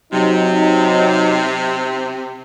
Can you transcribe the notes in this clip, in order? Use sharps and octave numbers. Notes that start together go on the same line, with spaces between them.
C3 F#3 C4 D#4